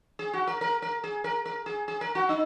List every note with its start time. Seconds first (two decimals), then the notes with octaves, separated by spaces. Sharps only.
0.19 G#4
0.33 F#4
0.47 A#4
0.61 A#4
0.82 A#4
1.04 G#4
1.24 A#4
1.46 A#4
1.66 G#4
1.88 G#4
2.01 A#4
2.15 F#4
2.29 D#4